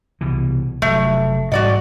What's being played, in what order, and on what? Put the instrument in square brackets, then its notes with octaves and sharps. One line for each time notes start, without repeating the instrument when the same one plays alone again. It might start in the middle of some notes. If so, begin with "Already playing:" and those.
[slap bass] C2 B2 E3
[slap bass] F1 F#3 [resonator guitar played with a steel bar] A3
[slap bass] A1 G#2 G3 [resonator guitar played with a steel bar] F#4 D5 D#5